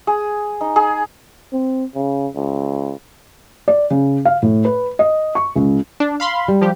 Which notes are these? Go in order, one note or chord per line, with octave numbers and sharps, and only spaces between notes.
G#4
D#4
G#4
C4
C#3
C#2
D5
C#3
F5
A2
B4
D#5
C#6
C#2
D4
F5 B5 C6
G3
F3 G4